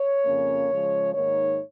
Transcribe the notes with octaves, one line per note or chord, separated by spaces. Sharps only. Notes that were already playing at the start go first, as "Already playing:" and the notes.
Already playing: C#5
F2 C#3 A#3 C#4
C#3 F3 G#3
G#2 D#3 A#3 D#4 C#5